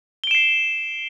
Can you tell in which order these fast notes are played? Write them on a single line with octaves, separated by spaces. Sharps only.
G7 D7 E7 C7